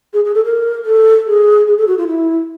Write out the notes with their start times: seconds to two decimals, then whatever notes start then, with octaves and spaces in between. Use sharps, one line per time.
0.13 G#4
0.25 G#4
0.34 A4
0.45 A#4
0.85 A4
1.27 G#4
1.67 G#4
1.78 A4
1.87 F#4
1.98 F4
2.07 E4